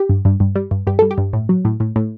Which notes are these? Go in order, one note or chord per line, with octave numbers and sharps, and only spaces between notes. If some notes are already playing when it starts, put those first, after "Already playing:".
Already playing: G4
G2
G2
G2
G3
G2
G2 G4
G3 A4
G4
G2
A2
F#3
A2
A2
A2